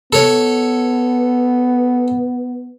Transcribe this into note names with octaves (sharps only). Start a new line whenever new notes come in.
B3 A4 C#5